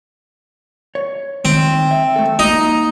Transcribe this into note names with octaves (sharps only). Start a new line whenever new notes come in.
C#5
D#3 C4
E5
A3 A4
A#3 D#4